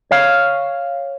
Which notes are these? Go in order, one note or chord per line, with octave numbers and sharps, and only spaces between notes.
C#5 F5